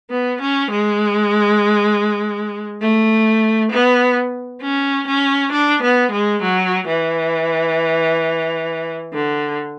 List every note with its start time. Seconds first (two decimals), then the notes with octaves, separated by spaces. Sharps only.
0.10 B3
0.42 C#4
0.71 G#3
2.81 A3
3.72 B3
4.62 C#4
5.08 C#4
5.52 D4
5.83 B3
6.12 G#3
6.43 F#3
6.88 E3
9.14 D3